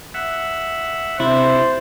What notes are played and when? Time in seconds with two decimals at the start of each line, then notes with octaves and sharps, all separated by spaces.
0.14 E5 F#5
1.20 C3 D4 E4 C5